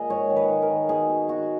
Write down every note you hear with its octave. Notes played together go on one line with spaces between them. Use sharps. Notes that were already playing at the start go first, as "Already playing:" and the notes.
Already playing: A#2 G#4 D#5
G#2 C#5
D#3
B4
D#3
A#4
D#3
B2 G#4
B2
B2 F#4